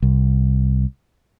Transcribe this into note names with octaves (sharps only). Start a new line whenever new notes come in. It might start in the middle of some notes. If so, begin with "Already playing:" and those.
C2